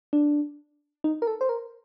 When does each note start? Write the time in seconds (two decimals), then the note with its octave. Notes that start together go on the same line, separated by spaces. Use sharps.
0.13 D4
1.04 D#4
1.22 A#4
1.27 A4
1.41 C5
1.49 A#4